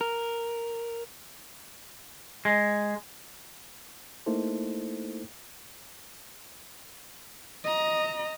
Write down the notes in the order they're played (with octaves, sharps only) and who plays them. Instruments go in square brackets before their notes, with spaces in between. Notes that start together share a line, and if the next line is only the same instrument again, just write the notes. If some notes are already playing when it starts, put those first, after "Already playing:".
[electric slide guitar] A#4
[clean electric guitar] G#3
[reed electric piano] A3 A#3 D#4 E4 A4 C5
[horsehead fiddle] D#5 A#5